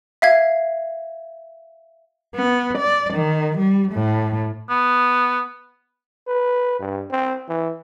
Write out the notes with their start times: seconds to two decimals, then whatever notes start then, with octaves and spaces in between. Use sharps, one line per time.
0.22 E5 F5 G#6
2.35 B3
2.78 D5
3.14 D#3
3.58 G3
3.92 A2
4.69 B3
6.27 B4
6.79 G2
7.11 C4
7.49 E3